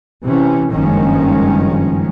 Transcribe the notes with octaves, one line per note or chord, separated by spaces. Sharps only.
C3 E3 C#4
F#1 G2 D#3 F3 G#3 C#4